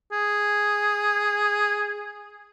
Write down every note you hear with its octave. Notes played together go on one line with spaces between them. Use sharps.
G#4